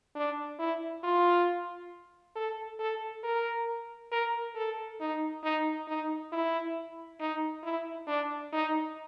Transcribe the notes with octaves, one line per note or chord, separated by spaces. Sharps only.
D4
E4
F4
A4
A4
A#4
A#4
A4
D#4
D#4
D#4
E4
D#4
E4
D4
D#4